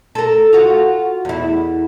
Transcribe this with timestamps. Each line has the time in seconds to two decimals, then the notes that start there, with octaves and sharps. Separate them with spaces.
0.15 A4 A#4
0.53 F4 F#4
1.25 E2 E4